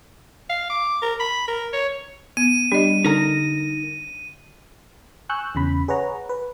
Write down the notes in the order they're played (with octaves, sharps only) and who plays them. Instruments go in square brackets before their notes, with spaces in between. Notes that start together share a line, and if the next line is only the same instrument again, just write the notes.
[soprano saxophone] F5
D6
A#4
B5
A#4
C#5
[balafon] B3 [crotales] D#7
[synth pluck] G3 [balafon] D4 D#5
[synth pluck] D3 A#6 [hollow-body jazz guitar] D#4 A#4 A#5
[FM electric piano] G#5 C#6 E6 F#6 G6
E2 C#3 B5
G#4 B4 C#5 F#5 A#5
B4